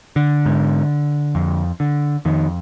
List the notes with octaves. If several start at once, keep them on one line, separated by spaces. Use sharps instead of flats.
D3
G#2
F2
D3
F2 D#3